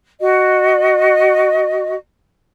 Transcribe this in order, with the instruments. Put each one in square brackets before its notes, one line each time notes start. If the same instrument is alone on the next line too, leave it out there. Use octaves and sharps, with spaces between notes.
[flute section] F#4 D#5